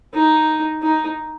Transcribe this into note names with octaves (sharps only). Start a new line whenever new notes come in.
D#4
D#4